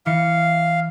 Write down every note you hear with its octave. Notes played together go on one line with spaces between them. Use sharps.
E3 F5 C#7